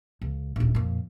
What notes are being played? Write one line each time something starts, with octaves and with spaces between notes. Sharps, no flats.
C#2
D#1 A#1
F2 A#2